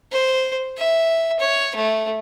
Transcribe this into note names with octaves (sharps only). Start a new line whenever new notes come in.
C5
E5
C#5
A3